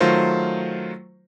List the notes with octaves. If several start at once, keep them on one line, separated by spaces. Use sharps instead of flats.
D#3 F#3 A3 F4 A#4 C5